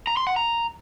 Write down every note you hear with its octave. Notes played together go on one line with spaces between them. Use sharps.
A#5
C6
F#5
A#5